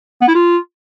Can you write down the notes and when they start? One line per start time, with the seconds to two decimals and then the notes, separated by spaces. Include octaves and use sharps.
0.22 B3
0.28 E4
0.35 F4